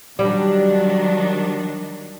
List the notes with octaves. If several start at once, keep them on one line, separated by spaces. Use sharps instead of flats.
D#3 F#3 G3 D4